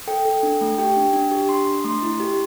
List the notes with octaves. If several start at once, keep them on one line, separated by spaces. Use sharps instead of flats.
A4 G5
A4
D4
A3
G4 G5
D4
D4
G4
D4 C6
D4
A3 C6
E4
G4